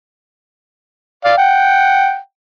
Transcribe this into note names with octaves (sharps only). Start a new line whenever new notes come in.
D5 F5
F#5 G5